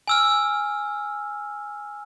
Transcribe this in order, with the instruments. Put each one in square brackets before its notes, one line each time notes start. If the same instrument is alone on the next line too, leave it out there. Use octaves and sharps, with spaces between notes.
[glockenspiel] G#5 E6 F6